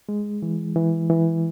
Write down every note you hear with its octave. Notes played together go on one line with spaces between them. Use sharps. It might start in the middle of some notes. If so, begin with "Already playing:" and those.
G#3
E3
E3
E3